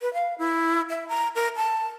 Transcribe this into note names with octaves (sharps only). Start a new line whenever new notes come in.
B4
F5
E4
E5
A#5
A#4
A5